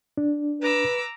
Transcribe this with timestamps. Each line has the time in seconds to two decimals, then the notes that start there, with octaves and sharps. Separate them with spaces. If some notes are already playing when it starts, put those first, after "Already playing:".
0.17 D4
0.62 B4 A#5 D6 E6